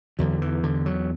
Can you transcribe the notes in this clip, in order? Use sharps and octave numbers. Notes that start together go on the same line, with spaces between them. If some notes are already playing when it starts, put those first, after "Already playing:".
E2 D3 F#3
E3
D3
F#3